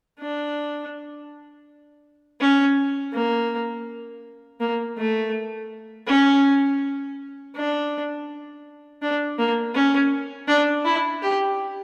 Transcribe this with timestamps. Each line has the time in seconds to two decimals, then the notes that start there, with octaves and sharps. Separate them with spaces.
0.19 D4
2.41 C#4
3.13 A#3
4.60 A#3
4.97 A3
6.07 C#4
7.55 D4
9.02 D4
9.39 A#3
9.74 C#4
10.48 D4
10.85 E4
11.22 G4